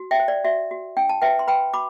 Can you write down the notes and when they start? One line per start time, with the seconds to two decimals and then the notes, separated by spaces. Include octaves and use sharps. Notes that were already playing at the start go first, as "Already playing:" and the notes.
Already playing: F#4
0.11 E5 G5
0.20 C5
0.28 D5
0.45 F#4 E5
0.71 F#4
0.97 D4 G5
1.09 A5
1.22 B4 E5 G5
1.39 C6
1.47 B4 G5 B5
1.74 F#4 B5 D6